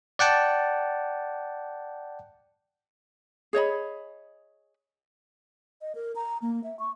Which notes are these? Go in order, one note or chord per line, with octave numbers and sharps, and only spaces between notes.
D5 F#5 G5 A5
G#4 C#5 D#5 B5
D#5
A#4
A#5
A#3
E5
C#6